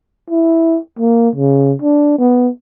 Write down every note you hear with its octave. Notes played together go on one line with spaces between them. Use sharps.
E4
A#3
C#3
D4
B3